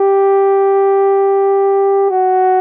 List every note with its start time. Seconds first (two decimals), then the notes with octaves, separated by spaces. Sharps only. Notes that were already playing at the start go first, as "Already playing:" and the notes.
Already playing: G4
2.10 F#4